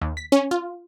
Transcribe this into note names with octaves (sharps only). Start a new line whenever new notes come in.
D#2
B6
C#4
F4